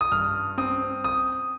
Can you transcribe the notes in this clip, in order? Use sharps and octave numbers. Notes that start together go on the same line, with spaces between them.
D#6
G2 F6
C4 D#6
D#6